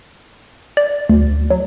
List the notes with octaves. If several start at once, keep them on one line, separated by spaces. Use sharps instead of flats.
D5
D2
F#3